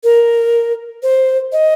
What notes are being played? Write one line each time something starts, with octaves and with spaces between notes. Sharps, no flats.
A#4
C5
D#5